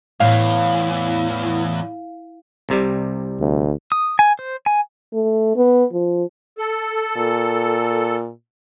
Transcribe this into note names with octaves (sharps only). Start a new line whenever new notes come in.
E2 A2 E3 F5
C2 C3 G3
D2
D#6
G#5
C5
G#5
A3
B3
F3
A4
A#2